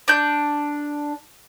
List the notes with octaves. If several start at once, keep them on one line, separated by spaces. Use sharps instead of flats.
D4 G6